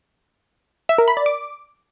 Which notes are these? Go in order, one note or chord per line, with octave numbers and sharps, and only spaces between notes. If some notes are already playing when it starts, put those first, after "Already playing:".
E5
A#4
B5
D5
D6